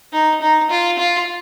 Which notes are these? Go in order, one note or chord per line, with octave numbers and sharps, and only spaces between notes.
D#4
D#4
F4
F4